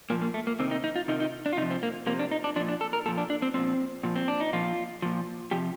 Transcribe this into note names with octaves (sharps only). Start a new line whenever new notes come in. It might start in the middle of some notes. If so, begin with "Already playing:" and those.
A#2 F3 A#3
A#3
A3
A#3
C3 D#3 C4
D#4
D#4
F4
C3 D#3 D#4
D#4
D4
F4
C3 F3 D#4
C4
A#3
C3 F3 A#3
D4
D#4
D4
A#2 F3 D4
D4
A4
A#4
A#2 F3 A4
D4
D4
C4
A#2 F3 C4
A#2 F3
C4
D4
D#4
A#2 F3 F4
A#2 F3
C3 F3 G4